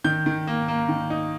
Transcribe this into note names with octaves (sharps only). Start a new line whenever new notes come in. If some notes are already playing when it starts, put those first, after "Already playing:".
D#3 G6
D#3
A#3
A#3
D#3
D#4